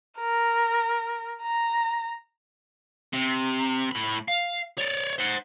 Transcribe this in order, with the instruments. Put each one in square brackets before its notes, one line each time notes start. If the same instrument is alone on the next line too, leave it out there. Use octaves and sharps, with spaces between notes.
[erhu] A#4
A#5
[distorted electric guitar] C3
A2 B5
F5
C#5 D5
C5 F#5